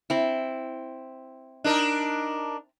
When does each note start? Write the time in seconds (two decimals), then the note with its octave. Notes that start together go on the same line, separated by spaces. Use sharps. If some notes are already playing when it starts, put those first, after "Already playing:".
0.10 C4 E4
1.64 D4 D#4 A#4